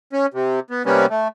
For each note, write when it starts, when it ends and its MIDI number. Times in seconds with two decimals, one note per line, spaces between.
0.13 0.26 61
0.34 0.60 48
0.70 0.83 59
0.86 1.06 48
0.86 1.06 55
0.86 1.06 58
0.86 1.06 59
0.86 1.06 61
1.10 1.28 57